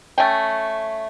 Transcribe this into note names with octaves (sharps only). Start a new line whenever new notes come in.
A3 C#4 G5